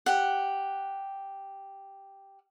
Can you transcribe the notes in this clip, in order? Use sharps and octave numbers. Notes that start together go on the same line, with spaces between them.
G4 F#5